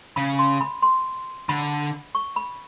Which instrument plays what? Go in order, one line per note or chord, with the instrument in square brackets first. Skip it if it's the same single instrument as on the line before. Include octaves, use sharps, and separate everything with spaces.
[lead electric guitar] C#3 [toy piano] B5
[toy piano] C6
B5
C6
[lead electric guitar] D3 [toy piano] B5
[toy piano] C#6
B5